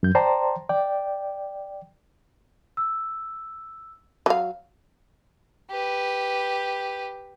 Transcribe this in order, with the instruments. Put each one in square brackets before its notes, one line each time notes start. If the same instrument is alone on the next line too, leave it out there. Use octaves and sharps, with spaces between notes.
[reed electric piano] F#2 G6
C5 D5 G5 A5 A#5 C6
D5 G5
[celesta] E6
[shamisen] F#3 F5
[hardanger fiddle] G4 B4